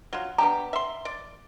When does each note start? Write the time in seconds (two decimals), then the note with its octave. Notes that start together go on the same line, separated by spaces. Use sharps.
0.13 F#3 F4
0.38 B3 D4 G4 A#5
0.73 E5 C6
1.05 D5